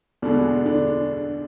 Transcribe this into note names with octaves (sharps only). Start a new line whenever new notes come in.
E2 B2 D3 G#3 D4
D3 D4